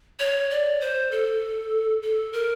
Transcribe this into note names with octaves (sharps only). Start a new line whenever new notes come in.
C#5
D5
C5
A4
A4
A#4